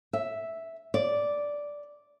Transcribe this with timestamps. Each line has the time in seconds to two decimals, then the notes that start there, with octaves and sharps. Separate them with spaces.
0.13 E5
0.94 D5